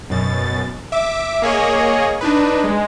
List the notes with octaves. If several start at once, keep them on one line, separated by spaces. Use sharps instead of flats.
F#2 B2 A6
E5 D6
A#3 G#4 C#5 D#5
D4 D#4 B4
G#3